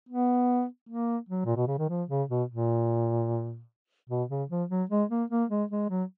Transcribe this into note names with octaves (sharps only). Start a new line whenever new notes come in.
B3
A#3
F#3
A#2
B2
C#3
D#3
F3
C#3
B2
A#2
B2
C#3
F3
F#3
G#3
A#3
A#3
G#3
G#3
F#3